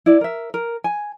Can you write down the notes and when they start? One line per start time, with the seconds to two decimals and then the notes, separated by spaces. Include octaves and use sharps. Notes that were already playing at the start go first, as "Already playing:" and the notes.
0.06 E4 D5
0.21 A#4 E5
0.54 A#4
0.84 G#5